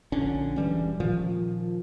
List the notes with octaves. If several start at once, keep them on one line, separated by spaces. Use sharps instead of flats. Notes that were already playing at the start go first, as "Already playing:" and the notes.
A#1 D3 C#4
E1 E3 G3 C#4
A#2 D#3 F3